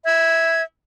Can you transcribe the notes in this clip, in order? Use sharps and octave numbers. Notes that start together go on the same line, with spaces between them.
E5 G#6